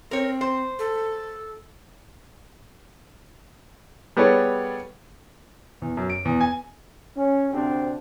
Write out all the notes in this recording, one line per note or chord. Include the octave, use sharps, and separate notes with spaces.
C4 A#4 C#5
C5
A4
G3 B3 G#4 A4 C#5
E2
F#2
D7
E2
G#5
C#4
D2 C3 C4 D4